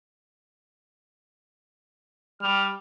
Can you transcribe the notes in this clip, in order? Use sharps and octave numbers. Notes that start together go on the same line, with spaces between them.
G3 F6